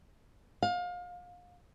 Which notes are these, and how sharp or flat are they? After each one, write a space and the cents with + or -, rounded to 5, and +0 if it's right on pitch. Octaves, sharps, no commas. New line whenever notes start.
F5 +30